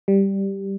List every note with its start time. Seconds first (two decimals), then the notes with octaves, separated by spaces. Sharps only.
0.08 G3